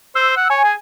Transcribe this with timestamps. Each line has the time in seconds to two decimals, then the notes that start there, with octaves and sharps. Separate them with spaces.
0.15 C5 E6
0.36 F#5
0.50 C#5 G#5
0.64 G#4